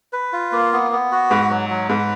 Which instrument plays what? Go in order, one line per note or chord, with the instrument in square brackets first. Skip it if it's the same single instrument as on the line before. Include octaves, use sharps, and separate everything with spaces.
[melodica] B4
F4
A#3
B3
B3
F#4
[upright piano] G#2 [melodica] B4
[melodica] F#3
F#3
[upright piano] G#2 [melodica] B4